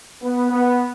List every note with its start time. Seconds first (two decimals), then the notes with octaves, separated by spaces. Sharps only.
0.22 B3
0.50 B3